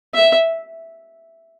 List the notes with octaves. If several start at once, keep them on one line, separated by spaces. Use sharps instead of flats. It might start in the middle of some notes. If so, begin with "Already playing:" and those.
E5